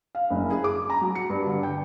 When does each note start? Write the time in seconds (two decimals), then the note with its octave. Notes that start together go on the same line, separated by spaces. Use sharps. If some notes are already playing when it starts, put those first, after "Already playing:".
0.15 F5
0.31 F#1
0.50 G#4
0.64 D6
0.90 A#5
1.01 F#3
1.15 C#7
1.30 G2
1.46 D3
1.63 G5